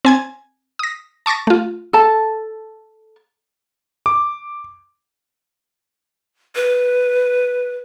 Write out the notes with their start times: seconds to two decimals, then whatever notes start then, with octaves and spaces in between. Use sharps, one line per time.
0.05 C4 G#5 G#6
0.79 D#6 A#6
1.26 A5 C#6 D6 A6 A#6
1.47 A3 F4
1.93 A4 A5
4.06 D6
6.55 B4